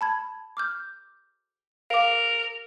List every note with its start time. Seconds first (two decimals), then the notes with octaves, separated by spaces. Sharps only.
0.01 A5 B5 G#6
0.57 D6 F6 G6
1.90 A#4 F5 D6